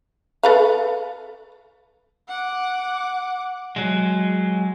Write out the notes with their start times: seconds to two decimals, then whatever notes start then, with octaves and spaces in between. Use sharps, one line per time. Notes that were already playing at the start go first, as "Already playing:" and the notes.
0.43 A4 B4 F5
2.28 F#5 D6
3.76 F#3 G#3